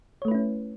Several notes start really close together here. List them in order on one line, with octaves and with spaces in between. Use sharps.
C#5 A3 B4 E4 C#4